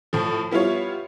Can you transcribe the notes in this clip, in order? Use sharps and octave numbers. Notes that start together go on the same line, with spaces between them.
A2 F3
G3 B3 E4 F4 C#5